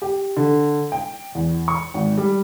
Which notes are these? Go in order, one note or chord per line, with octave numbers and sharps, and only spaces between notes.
G4
D3
G5
E2
C#6
G#1
G3